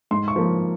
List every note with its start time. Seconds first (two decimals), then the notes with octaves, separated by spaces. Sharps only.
0.11 G#2 C6
0.28 C#6
0.36 F3 A#3